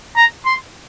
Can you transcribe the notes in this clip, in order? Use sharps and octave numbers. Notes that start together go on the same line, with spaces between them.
A#5
C6